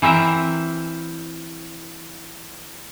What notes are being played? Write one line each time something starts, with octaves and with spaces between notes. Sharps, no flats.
E3 C4 A#4 E5